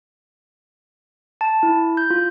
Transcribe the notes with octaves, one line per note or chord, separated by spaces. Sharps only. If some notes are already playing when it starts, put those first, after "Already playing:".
A5
E4
G6
F4